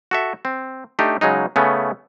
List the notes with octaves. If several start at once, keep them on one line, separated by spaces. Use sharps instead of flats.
F#4 A4 E5
C4
A3 D4 D#4 G4
C#3 F#3 G#3 D#4
C#3 A3 B3 C#4